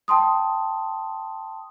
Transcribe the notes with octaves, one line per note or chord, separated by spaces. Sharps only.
G5 A5 C6 D#6